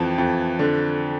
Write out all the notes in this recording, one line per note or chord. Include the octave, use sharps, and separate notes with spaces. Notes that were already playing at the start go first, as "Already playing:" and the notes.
Already playing: F2 E3 G5 A5
F2
D3